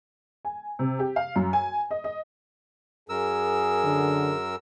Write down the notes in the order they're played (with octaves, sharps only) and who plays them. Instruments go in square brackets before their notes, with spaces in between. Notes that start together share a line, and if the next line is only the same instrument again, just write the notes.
[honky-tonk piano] G#5
C3
G4
F5
F#2
G#5
D#5
D#5
[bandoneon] F#2 A#4 E6 [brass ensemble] G#4
[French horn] D3